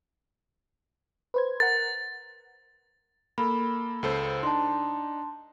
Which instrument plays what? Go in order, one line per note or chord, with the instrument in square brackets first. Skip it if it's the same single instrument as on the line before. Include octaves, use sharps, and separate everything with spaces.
[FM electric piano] B4 C5 G#6
[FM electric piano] A#4 F#5 [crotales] A6
[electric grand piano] A#3 A4 [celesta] B5
[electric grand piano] C#2 A4 C5
[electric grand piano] D4 D#4 [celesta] A5 C6